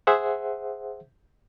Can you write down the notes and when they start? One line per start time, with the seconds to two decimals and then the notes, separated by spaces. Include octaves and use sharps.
0.07 G#4 C5 E5 F#5